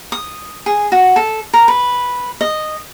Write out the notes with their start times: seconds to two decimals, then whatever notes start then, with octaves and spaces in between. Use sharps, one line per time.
0.12 D#6
0.66 G#4
0.92 F#4
1.16 A4
1.54 A#4
1.68 B4
2.41 D#5